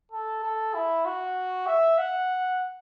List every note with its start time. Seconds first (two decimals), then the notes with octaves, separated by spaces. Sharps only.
0.12 A4
0.43 A4
0.75 E4
1.05 F#4
1.67 E5
1.98 F#5